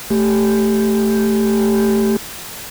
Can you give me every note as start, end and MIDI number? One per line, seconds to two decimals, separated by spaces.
0.10 2.16 57
0.10 2.16 67